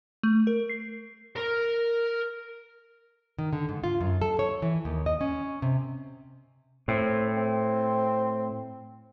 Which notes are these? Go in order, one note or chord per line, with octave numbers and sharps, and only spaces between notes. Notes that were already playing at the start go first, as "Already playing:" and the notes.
A3
A#4
C7
A#4 A#5
D#3
D3
G#2
F4
F#2
A4
C#5
E3
D#2
D#5
C#4
C3
A2 C4
C4